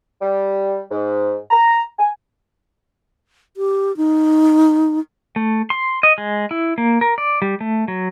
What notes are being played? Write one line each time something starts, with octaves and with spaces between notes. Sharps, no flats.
G3
G#2
A#5
G#5
G4
D#4
A3
C6
D#5
G#3
E4
A#3
A#4
D5
G3
A3
F#3